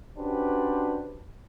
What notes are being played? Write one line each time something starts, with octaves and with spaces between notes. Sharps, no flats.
C#4 D4 F#4 G4 B4 C5